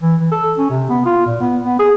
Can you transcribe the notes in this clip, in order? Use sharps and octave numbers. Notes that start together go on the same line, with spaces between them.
E3
E3
A4
C#4
C3
B3
F4
A#2
B3
B3
G#4